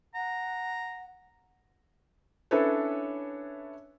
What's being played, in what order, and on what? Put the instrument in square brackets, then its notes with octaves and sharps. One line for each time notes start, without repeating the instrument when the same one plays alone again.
[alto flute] F#5 [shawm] A#5
[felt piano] C#4 D4 E4 A4 B4 C#5